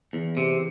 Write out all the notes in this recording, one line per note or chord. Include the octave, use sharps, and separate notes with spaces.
E2
C3